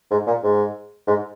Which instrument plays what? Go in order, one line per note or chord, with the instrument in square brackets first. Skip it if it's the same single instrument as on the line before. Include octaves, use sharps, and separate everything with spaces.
[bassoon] G#2
A#2
G#2
G#2